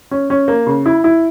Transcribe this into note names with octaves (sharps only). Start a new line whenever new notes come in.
C#4
C#4
A#3
C#3
E4
E4